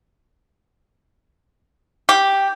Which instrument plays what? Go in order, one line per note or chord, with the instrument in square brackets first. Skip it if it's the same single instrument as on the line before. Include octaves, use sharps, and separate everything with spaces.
[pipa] G4